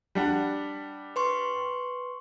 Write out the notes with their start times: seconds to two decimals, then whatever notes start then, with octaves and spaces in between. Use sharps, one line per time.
0.15 G3 D4 F#5
1.16 B4 C6 C#6